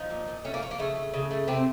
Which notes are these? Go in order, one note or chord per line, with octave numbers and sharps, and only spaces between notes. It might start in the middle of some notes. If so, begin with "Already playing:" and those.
Already playing: F3 D#4
A#2
A#2
A3 C#4
A#3
F3 C#4
A#3
C#3 A3
A3
C#3
A3
C3 C4